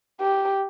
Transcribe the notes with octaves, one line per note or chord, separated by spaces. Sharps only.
G4